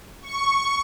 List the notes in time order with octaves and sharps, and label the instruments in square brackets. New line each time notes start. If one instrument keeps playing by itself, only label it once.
[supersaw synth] C#6